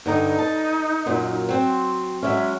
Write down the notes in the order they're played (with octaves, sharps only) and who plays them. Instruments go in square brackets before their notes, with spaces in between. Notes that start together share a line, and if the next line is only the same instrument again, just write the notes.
[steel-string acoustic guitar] G2 D3 A#5 [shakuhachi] D#4
[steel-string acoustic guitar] A5
F#2 A#2 F#3
F#3 C4
[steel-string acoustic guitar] F#3 G#3 C#4 [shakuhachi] E5